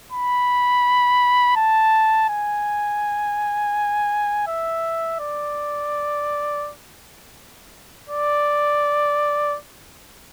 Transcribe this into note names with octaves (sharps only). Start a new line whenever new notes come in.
B5
A5
G#5
E5
D5
D5